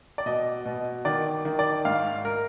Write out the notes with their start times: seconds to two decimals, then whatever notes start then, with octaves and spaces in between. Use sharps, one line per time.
0.18 D5
0.26 B2 D#5
0.66 B2
1.05 D#3 D5
1.45 D#3
1.59 D5
1.85 G#2 F5
2.25 A#4